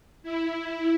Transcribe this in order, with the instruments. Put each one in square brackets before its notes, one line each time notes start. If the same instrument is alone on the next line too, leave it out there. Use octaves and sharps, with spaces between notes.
[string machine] E4